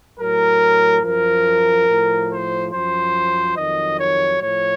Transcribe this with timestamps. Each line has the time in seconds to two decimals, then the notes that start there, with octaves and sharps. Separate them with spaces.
0.18 A2 F#3 A#4
1.03 F#2 F3 A#4
1.88 A2 F3
2.30 C5
2.72 F#2 F3 C5
3.57 F2 D#3 F#3 D#5
3.99 C#5
4.41 A2 F3 C#5